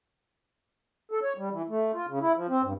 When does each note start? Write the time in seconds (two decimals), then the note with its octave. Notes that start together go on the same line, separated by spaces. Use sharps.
1.11 A4
1.23 C#5
1.38 G3
1.51 E3
1.69 A3
1.94 F4
2.08 C#3
2.21 E4
2.36 F3
2.49 C4
2.63 G2